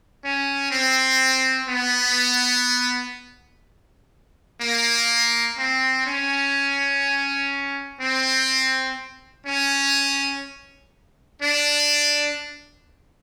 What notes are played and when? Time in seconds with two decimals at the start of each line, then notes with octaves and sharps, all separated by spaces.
0.24 C#4
0.71 C4
1.69 B3
4.61 A#3
5.58 C4
6.06 C#4
8.01 C4
9.46 C#4
11.41 D4